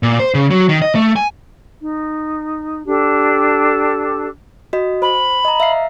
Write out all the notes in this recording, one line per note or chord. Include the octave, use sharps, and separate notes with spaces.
A#2
C5
C#3
F#3
D#3
D#5
A3
G#5
D#4
D4 G4 A4
F#4 D#5
C5 B5
D#5 A#5
E5 F5 C7